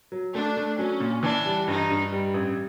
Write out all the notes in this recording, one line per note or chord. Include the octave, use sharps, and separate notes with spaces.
F#3
A3 D4
A3
F#3 C#4
A#2
E3 D4
G3
G2 D#4
G2
G3
A1